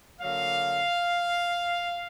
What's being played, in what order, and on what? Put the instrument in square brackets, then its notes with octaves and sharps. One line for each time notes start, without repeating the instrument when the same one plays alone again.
[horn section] D3 F#3 A#3 F5